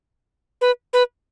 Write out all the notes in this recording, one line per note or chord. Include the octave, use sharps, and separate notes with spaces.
B4
B4